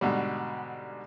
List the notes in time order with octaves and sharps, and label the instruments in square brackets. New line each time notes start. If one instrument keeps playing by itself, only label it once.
[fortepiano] G#2 B2 D3 G3